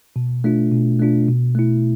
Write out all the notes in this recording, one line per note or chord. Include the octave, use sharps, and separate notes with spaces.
B2
A3 D4 F4
B2
A3 D4 F4
B2
A3 E4